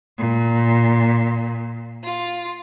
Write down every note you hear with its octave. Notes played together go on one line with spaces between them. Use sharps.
A#2
F4